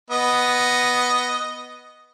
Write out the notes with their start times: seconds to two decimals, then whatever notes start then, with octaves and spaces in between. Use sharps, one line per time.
0.11 B3 D#5